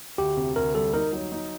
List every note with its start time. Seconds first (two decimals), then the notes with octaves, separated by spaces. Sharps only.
0.18 D2 G4
0.37 C3
0.56 D2 A#4
0.75 G3 A4
0.93 D#4 A#4
1.13 F#3
1.32 D#4